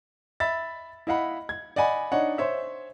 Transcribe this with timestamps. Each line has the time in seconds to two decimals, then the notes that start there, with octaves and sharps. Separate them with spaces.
0.40 E5 B5 A6
1.07 E4 D#5 F5 F#5 B5
1.49 G#6
1.76 D5 D#5 F#5 G#5 B5
2.12 D4 D#4 C#5 F#5
2.38 C5 C#5 E5